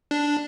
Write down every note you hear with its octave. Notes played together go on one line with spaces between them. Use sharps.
D4